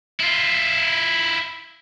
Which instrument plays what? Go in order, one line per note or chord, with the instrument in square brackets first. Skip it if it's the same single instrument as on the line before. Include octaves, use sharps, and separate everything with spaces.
[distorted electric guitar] E4 F4